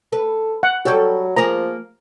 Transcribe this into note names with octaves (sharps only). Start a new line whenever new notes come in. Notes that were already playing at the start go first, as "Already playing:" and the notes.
A4 B4
F#5
F#3 G3 G4 A4 C#5 G5
F3 A#3 G#4 A#5